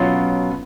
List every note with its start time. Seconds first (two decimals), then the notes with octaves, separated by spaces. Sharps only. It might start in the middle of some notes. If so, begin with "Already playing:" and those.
Already playing: B2 F#3 C#4 F4